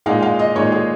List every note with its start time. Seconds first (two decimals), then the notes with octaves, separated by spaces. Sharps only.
0.06 A#2 G#3 D#4 F5
0.22 F5
0.39 D#5
0.55 A#2 G#3 D#4 C#5
0.72 G#4